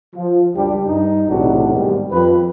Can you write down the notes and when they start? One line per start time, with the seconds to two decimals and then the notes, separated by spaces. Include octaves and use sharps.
0.14 F3
0.55 C#2 F#2 G3 D4 G4
0.85 G2 D#4
1.27 B1 E2 A2 C3 D4 F#4
1.74 G#2 B2 D#3 G3
2.11 F2 B4